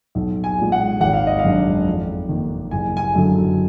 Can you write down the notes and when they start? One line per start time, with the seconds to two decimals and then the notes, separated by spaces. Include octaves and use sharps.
0.15 B1
0.44 G#5
0.58 A#2 G#3
0.72 F#5
1.01 G#1 F#5
1.13 F5
1.27 D#5
1.39 F5
1.44 F#2 D#3 G#3 D4
1.86 F2
2.29 D#3 A#3
2.71 F#1 G#5
2.97 G#5
3.15 F#2 D3 F#3